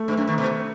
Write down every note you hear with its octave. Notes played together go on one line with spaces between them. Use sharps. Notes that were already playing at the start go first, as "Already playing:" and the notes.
Already playing: A3
G2
F#2
B2 D#3
B2